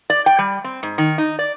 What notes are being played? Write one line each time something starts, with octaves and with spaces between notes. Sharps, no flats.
D5
G5
G3
C4
G#2
D#3
D#4
D5